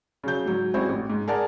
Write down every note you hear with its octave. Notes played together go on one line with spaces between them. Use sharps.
C#3 F#3 G6
G#2 F#3
G3 G#3 C4 C#4 E4 F#4
A1
G#2
G#4 A#4 D5 F#5 A5